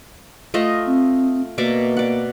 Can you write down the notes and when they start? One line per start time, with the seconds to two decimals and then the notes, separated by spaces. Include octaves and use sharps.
0.54 A3 F4 D#5
0.86 C4
1.58 B2 A#3 D5 E5
1.97 D5 F#5